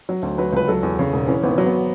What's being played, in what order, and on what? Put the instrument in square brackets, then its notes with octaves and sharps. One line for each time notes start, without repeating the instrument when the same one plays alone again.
[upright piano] F#3
D2
F#3 B4
C#2 B4
F#3 A4
E2
C#3
E1
E3 C#4
G#1 B3
F#3
B3